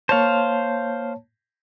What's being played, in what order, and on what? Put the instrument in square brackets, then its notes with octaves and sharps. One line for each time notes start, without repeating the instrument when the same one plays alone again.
[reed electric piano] A#3 C#5 A5 [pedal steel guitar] C5 F5